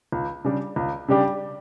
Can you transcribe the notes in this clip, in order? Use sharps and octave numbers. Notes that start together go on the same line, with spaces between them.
C#2
C#3 G3 D4 G4
C#2
C#3 G3 D4 G4